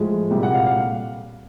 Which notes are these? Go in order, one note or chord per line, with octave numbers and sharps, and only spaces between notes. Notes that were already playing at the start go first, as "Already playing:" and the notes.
Already playing: A2 F3 G#3
C2 A#2 G3
F#5
F5
F5